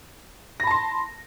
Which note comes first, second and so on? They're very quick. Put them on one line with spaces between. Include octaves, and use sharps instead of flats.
A#6 B5 A5 C6